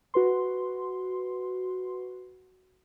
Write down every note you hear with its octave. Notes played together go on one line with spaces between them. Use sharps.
F#4 B4 C6